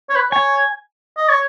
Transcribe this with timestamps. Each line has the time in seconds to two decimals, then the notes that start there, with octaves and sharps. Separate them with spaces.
0.10 C#5
0.15 B4
0.32 C#5 G#5
1.17 D#5
1.29 C#5